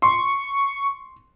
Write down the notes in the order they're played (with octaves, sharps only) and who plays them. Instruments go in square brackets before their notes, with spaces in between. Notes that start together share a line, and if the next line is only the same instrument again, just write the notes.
[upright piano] C6 [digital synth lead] C#6